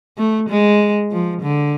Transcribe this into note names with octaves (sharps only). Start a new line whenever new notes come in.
A3
G#3
F3
D3